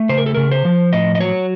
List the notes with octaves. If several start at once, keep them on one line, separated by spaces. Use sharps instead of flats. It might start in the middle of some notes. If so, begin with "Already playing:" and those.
Already playing: A3
C#3 C5
A#4
A4
C#3 A#4
C5
F3
A2 D#5
D#5
F#3 C#5